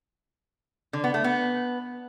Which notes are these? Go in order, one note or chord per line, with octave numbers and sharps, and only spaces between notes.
D3
B3
A3
B3